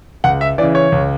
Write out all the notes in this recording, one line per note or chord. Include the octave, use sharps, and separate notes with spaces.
C#2 F#5
E5
C#3 E3 D5
C#5
C#2